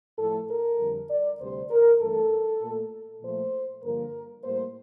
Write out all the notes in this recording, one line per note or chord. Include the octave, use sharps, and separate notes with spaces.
A2 F3 A3 A4
A#4
F2 D3 G3
D5
D2 C3 G3 C5
A#4
G2 E3 A3 A4
A#2 A3
A#2 F3 A3 C5
G2 D3 F3 A#3 A#4
A2 G3 A#3 C5